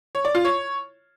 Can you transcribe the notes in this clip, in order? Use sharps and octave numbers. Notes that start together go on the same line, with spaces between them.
C#5
D5
F4
C#5